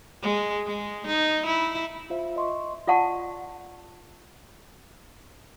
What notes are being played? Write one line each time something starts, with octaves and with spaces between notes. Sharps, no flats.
G#3
G#3
D#4
E4
F4 C5 E5
D#5 C6 C#6
F4 D5 F#5 A5 C#6